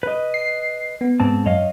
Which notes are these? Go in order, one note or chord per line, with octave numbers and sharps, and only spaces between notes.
B4 D#5
C7
B3
G#2 C4 A5
F#2 C#5 D#5 F5